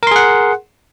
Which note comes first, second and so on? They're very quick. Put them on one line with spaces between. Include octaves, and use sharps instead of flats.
A#4 C6 G#4 F#5